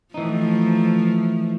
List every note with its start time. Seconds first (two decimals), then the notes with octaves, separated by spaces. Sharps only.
0.14 E3 F3 A3 D#4